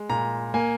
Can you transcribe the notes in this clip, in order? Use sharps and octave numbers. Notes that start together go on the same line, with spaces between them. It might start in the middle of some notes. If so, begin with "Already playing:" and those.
Already playing: G#3
A#2 A#5
A#3 G#5